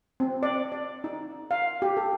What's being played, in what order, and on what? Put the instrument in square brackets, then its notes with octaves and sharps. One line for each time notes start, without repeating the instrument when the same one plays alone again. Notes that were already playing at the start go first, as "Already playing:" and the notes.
[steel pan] C4
D5
D5
D#4
F5
G4
A4